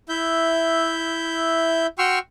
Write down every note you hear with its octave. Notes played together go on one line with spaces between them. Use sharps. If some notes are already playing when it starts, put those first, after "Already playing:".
E4 E5 G6
F#4 G5 C6 C#6 E6 F6